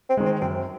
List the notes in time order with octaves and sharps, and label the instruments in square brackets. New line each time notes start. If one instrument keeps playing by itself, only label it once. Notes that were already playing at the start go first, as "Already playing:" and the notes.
[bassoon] C4
[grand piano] D#3 G#3
[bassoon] C4
[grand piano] F#2 [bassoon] C4